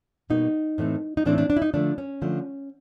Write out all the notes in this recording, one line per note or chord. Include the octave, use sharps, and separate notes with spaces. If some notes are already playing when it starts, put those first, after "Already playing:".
B2 G3 A#3 D#4
A2 E3 A3 C4
D#4
A2 E3 A3 C4 D4
D4
D4
E4
D#4
D3 F3 A3 D4
C#4
D3 F3 A3